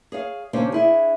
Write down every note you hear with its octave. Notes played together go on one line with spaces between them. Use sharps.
G#4 C#5 F5
D#2 C#3 A#3 D4 G4 C5
D4 E4 G#4